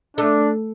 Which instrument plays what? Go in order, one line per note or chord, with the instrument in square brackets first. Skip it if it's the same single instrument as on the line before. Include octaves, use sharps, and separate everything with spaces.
[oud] A3 [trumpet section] D4